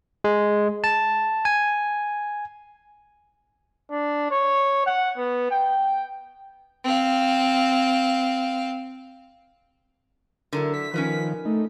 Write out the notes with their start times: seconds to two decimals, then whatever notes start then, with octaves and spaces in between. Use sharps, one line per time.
0.24 G#3
0.84 A5
1.45 G#5
3.91 D4
4.31 C#5
4.86 F#5
5.17 B3
5.51 G5
6.84 C4 F5
10.53 D3 F#3 E4 A#4
10.74 B6
10.94 D#3 F3 C#4 A#4 B4
11.45 A3 D#4